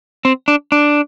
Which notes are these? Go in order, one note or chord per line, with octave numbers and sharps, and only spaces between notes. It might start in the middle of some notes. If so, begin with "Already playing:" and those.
C4
D4
D4